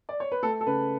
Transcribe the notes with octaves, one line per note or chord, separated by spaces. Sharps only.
D5
C#5
B4
A3 A4
A4
C#3 B4